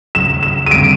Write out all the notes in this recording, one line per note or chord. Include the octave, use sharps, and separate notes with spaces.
D#2 C#3 F#3 E7
E7
D#7
F2 D3 G3 C4 D7